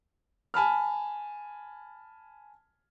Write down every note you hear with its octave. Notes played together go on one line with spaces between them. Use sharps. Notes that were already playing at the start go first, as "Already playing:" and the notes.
G#5 A5 B5 F6